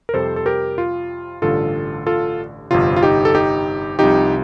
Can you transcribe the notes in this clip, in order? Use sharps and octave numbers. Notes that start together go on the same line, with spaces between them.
A#4
F2 C3 G3 A4 C5
A4
G4 A#4
F4
A1 G2 D3 F4 A4
F4 A4
G1 F2 C3 F4
F4
D#4 G4
A4
D#4 G4
C2 C3 F3 D#4 G4